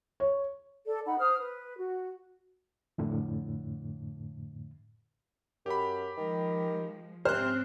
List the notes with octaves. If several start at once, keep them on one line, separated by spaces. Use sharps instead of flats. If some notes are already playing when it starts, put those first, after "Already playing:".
C#5
A4 D5
D#4 F#5 B5
C5 D#6 F6
B4
F#4
F2 A2 D3
F#2 G4 B5
D#3 F3 G#3
G#2 C3 C4 C#4 C5 F6 F#6